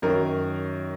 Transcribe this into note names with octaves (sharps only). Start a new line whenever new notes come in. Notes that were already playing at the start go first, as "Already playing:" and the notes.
F#2 D#3 F#3 A#4